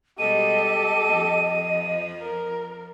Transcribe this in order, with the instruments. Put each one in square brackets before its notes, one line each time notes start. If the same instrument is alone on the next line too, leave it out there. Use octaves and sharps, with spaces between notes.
[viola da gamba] B2 G3 G#3 [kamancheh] G4 A4 [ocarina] D#5 [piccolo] D#7
[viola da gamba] F2 F3
[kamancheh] A#4